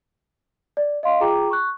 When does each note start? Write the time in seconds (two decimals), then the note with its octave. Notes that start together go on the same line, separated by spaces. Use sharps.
0.77 D5
1.03 D#5 F5 C6
1.20 F4 G#4 G5 A#5 D6
1.50 C#6 F#6